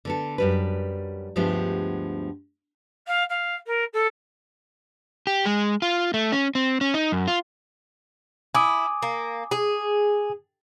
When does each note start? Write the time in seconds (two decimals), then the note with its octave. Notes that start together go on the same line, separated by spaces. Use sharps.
0.05 D3 B3 A4
0.38 F#2 G3 B4
1.36 D2 G2 F3 G#3 B3 G4
3.07 F5
3.29 F5
3.66 A#4
3.93 A4
5.27 G4
5.46 G#3
5.82 F4
6.14 A3
6.32 C#4
6.55 C4
6.81 C#4
6.94 D#4
7.12 F#2
7.28 F4
8.55 E4 G#5 D6 D#6
9.02 A#3
9.51 G#4